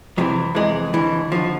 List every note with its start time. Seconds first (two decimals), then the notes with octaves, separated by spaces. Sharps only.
0.17 F2 C3 E3 F#3
0.55 F2 C3 E3 G#3
0.93 D#2 D3 E3
1.31 D#2 D3 F3